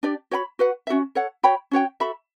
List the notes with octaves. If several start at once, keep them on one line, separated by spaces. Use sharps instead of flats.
D4 G4 D5
F#4 C#5 G5 B5
F#4 B4 F#5
C#4 F#4 A4 E5
A4 C#5 F#5
F#4 C#5 G5 B5
C#4 F#4 C#5 G5
F#4 A4 E5 B5